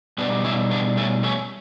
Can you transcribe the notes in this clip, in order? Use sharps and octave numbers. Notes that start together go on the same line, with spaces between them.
B2 G3 B3 D4
C#4 E4
B3 D4
A3 C#4
A3 C#4